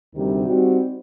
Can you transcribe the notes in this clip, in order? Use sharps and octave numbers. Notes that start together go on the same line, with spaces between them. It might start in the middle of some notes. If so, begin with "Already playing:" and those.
D2 C3 D#3 G3
G3 C4 D#4 F#4